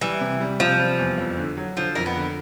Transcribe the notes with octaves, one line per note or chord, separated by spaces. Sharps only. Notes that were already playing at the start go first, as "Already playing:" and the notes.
E3 G3
C3
G3
C3 F3
G3
E2
F2
D3
F#3
D3 F3
F2 A#3
B3
D3